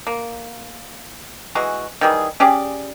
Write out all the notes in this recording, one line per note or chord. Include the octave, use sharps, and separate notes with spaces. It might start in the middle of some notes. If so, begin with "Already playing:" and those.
A#3
E3 G#3 F#4
D#3 E3 G3 G#4
C#4 G4 G#4 D5